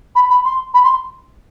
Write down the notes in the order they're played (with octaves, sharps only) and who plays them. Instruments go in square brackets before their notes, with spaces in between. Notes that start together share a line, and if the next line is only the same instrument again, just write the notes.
[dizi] B5
B5
C6
B5
C6